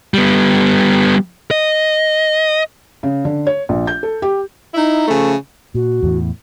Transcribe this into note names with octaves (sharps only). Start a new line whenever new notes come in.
G3 B3
D#5
C#3
D3
C#5
A#1
G6
A4
G4
D#4 E4
C#3 F3 A3
A#2 F#4
E2 A2 E3